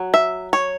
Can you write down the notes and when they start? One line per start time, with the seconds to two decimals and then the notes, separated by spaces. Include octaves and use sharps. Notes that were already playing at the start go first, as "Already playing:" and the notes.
Already playing: F#3
0.14 E5
0.53 C#5